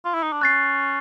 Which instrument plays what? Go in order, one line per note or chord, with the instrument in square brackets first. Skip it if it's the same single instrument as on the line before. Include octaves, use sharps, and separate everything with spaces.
[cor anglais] F4
E4
D#4
D4
[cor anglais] C#4 [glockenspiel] F#6 A6 C7